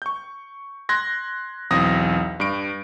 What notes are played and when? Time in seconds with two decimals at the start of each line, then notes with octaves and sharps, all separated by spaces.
0.02 C#6 G6
0.89 C6 F#6 G#6 A#6
1.71 B1 E2 C4 D#6 A#6
2.40 G2 D7